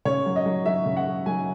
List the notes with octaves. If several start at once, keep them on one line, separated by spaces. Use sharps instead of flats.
C#3 C#5
F#3
D#5
F#3
F#3 E5
C#3
F#5
F#3
F#3 G#5